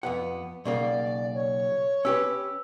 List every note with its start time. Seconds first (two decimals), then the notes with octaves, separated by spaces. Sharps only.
0.03 F2 B3 F#5
0.65 B1 C#3 A#3 D5
1.34 C#5
2.05 C#4 G4 B4 E6